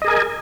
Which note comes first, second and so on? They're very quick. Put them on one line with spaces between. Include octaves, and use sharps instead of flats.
D#5 G#4 A#4 G#5